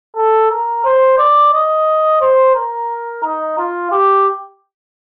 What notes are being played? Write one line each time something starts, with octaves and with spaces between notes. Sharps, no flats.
A4
A#4
C5
D5
D#5
C5
A#4
D#4
F4
G4